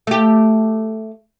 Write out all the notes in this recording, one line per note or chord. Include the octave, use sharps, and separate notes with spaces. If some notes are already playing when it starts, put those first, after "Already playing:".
A3 G4